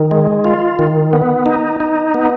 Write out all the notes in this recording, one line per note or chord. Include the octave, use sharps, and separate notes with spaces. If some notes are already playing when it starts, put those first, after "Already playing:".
Already playing: D#3
G#3
F4
D#3
B3
D#4
D#4
B3